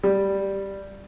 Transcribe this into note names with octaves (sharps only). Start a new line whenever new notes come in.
G3